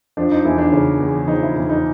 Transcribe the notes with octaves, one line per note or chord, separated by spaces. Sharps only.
F3 D4
D#4
E2 E4
D4
C#3 C#4
E2
F3 D#4
E4
E2 E4
D#4